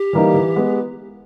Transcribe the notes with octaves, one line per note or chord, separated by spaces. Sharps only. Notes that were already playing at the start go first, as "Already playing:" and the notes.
Already playing: G4
E3 G3 A#3 D#4
E3
G#3 B3